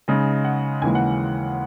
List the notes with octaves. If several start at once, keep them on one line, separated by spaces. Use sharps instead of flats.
C#3 G#3 D#4 D#5
F#5
D#2 C#3 E3 G#3 G#5
F#5